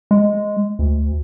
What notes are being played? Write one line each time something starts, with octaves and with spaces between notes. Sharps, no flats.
G#3
D2